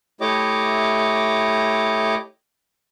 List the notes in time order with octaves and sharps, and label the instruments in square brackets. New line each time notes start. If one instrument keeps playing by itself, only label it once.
[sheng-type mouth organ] A3 E4 G4 C#5 D#5 D6